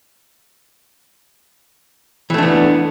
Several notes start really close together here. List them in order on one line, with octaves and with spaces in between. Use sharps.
E3 A3 D4 B3